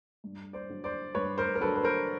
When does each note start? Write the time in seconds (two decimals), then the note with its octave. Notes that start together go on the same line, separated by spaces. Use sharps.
0.24 G2
0.53 C5 D5
0.69 D3 F#3
0.84 C5 D5
1.15 G2 B4 C#5
1.38 A#4 C5
1.55 A#4
1.61 D3 F#3 A4 B4
1.76 B4
1.83 A#4 C5